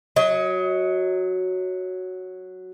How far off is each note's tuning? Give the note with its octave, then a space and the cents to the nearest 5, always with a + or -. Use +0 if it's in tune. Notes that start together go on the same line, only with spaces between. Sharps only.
F#3 +0 D#5 +30